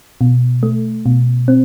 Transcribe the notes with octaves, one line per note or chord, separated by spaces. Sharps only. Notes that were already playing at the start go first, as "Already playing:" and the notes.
B2
A3
B2
C4